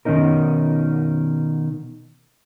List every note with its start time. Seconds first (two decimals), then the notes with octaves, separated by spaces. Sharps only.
0.05 B2 D#3 C4 C#4 D#4 A#4